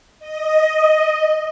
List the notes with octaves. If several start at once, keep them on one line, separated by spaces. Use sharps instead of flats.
D#5